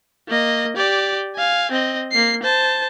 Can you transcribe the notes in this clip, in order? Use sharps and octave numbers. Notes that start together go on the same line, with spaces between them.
A#3 D#5
G4 D5
F5 G#5
C4 D#5
A#3 C7
C5 A5